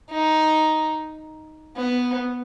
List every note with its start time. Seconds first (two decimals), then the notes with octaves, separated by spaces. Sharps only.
0.10 D#4
1.76 B3